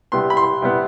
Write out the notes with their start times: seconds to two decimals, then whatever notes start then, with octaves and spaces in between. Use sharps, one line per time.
0.12 C3 G3 B3 C6
0.30 B5
0.37 C6
0.62 C3 G3 B3